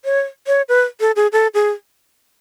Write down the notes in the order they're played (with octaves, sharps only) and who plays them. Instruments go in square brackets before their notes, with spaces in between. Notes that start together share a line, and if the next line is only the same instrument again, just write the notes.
[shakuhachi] C#5
C#5
B4
A4
G#4
A4
G#4